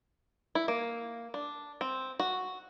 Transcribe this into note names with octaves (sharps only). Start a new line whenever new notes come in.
E4
A#3
D4
C4
F#4